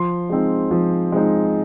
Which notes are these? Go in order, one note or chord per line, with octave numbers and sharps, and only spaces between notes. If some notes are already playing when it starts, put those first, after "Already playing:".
Already playing: F3 C6
G#3 C4 D#4
F3
G#3 C4 D#4